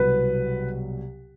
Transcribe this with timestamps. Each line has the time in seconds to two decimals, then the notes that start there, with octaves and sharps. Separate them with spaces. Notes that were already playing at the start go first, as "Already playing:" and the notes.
Already playing: C2 B2 F#3 B4